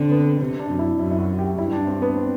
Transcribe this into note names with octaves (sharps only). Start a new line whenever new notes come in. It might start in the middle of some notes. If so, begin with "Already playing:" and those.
Already playing: D3 C4
B3
C3 C4
D4
F#2
E4
F#2 E4
E4
F#4
G4
G2 E4
D4
C4
B3
C4